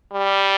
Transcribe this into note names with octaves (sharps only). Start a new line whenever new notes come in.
G3